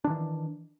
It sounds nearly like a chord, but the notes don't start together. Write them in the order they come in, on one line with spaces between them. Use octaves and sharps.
D4 D#3 E3